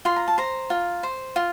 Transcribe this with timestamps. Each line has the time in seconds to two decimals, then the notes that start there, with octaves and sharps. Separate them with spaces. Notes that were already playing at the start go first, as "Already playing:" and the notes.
0.05 F4 C6
0.16 A#5
0.28 A5
0.38 C5 A#5
0.70 F4
1.03 C5
1.36 F4